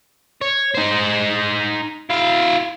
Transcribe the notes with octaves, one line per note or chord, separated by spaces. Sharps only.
C#5
D#4 C5
E4 F5